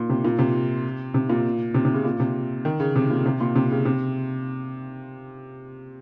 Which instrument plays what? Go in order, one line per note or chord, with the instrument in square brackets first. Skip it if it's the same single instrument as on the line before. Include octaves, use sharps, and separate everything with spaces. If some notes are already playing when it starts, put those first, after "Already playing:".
Already playing: [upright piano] A#2
C3
A#2
C3
C3
A#2
C3
C3
C#3
A#2
C3
D#3
C#3
C3
A#2
C3
A#2
C3
C#3
C3